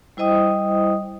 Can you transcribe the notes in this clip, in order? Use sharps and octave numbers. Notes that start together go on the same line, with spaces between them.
G3 E4 C5 D#5 G5 D#6